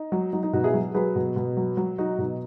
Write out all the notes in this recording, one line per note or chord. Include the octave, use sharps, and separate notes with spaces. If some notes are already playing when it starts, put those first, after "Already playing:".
Already playing: D#4
F#3
F#3 D#4
D#4
B2 D#4 F#4
E4 G#4
F#3
F#3 G#4 B4
B2
B2
F#3
F#3
F#3 D#4 F#4
B2 D#4